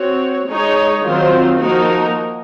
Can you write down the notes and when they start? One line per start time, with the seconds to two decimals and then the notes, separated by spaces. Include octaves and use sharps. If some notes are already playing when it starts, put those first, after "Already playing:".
Already playing: C4 F#4 C#5
0.46 G#3 D#4 G#4 C#5
1.02 D#3 F#3 C4 F4 C5
1.58 F3 A#3 D#4 F#4 A#4